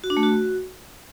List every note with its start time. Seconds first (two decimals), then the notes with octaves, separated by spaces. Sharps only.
0.04 F#4
0.10 D4
0.17 A3
0.23 F#4